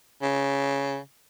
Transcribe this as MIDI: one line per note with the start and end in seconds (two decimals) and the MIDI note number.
0.22 0.99 49